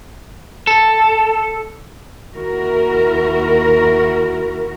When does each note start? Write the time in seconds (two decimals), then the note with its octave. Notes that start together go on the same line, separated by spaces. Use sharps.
0.67 A4
2.33 D#2 E4 F#4 A#4